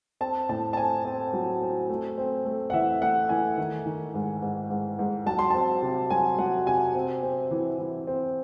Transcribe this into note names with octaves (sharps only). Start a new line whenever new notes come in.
C4 A5
A2 A5
A5
C4 G#5
C4
F#3
C4
A3
C4
A3
F#5
E3 E5
A3 F#5
E3 G#5
D#3
D#3
G#2
G#2
G#2
G#2
F#3 A5
C6
C4 A5
C3
F#3 G#5
F#3 F#5
C3 G#5
C4
C4
E3
E3
C4